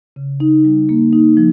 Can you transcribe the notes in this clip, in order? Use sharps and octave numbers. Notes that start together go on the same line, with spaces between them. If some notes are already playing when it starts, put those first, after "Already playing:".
C#3
D#4
G3
A#3
D#4
F3